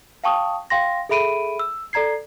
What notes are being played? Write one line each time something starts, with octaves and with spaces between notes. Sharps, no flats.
F5 G5 A5 C#6 D#6
F5 G5 C6 A#6
G#4 A4 E5 B5 D7 D#7
E6
A4 D5 A#5 G#6 C7